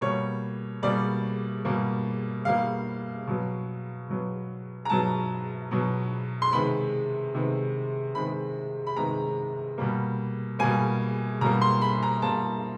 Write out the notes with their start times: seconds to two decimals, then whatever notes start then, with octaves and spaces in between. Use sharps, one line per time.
0.01 B2 G3 A#3 C#5
0.83 B2 G3 A#3 D5
1.65 B2 G3 A#3
2.45 B2 G3 A#3 F5
3.27 B2 F#3 B3
4.09 B2 F#3 B3
4.85 A#5
4.90 B2 F#3 B3 A5
5.71 B2 F#3 B3
6.42 C6
6.53 C3 D#3 G#3 B3 B5
7.34 C3 D#3 G#3 B3
8.15 C3 D#3 G#3 B3 B5
8.87 B5
8.96 C3 D#3 G#3 B3 A#5
9.78 B2 G3 A#3
10.59 B2 G3 A#3 G#5
11.41 B2 G3 A#3 A#5
11.61 C6
11.82 B5
12.03 A#5
12.22 B2 G3 A#3 A5